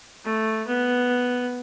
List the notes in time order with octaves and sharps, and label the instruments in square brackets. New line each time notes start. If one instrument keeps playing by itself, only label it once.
[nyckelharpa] A3
B3